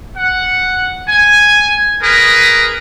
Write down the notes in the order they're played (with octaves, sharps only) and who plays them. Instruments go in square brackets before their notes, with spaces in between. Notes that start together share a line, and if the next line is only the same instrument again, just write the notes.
[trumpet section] F#5
G#5
G#4 A#4 B4